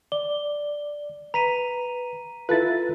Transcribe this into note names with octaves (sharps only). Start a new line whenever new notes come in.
D5 G7
B4 A#5 B6 D#7
E4 F4 A4 B4 A6